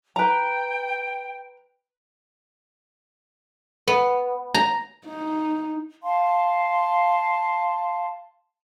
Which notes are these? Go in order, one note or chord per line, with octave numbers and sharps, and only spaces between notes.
B4 G5 A#5
B3
A#5
D#4
F5 A5 C6